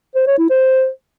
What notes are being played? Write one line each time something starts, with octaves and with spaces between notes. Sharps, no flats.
C5
C#5
E4
C5